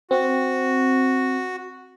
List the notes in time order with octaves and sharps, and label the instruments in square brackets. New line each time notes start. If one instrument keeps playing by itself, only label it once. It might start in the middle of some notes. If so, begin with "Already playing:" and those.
[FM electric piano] C4 [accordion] F#4